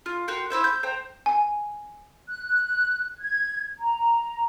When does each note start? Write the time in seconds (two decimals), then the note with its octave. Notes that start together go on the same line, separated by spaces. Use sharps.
0.06 F4
0.28 F#4 A#4 G5 C6
0.50 E4 B4 C5 E5
0.64 G6
0.83 C5 G5 A#5
1.26 G#5
2.30 F#6
2.44 F#6
3.17 G#6
3.79 A#5